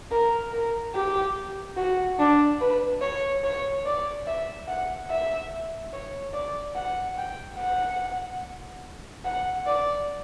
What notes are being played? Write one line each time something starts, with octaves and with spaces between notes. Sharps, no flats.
A#4
A#4
G4
F#4
D4
B4
C#5
C#5
D5
E5
F#5
E5
C#5
D5
F#5
G5
F#5
F#5
D5